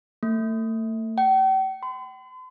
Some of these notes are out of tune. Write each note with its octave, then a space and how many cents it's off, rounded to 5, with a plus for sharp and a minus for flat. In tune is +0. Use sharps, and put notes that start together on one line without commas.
A3 +35
G5 -40
C6 -45